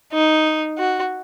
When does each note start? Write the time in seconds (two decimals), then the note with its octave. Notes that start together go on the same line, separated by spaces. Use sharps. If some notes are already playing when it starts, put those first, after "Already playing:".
0.13 D#4
0.78 F#4